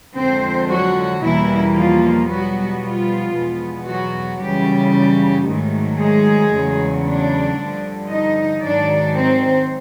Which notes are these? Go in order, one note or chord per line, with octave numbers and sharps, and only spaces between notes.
F2 D3 F3 G#3 C4 C5
F#3 F#4
E2 B2 E3 G3 A#3 E4
F3 F4
B2 F#3 G3 B3 F#4
F3 F4
E2 B2 G#3 B3
F#3 F#4
F#2 C#3 E3 G3 G4
G#2 D#3 F#3 A3
G#3 G#4
E2 C#3 F#3 A3
D4 D5
G2 D3 F3
D#4 D#5
G#2 D#3 F#3 D4 D5
C4 C5